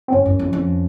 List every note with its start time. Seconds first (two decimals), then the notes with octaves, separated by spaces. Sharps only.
0.08 C4
0.12 G2 C#4
0.26 F#2
0.39 F2
0.53 F2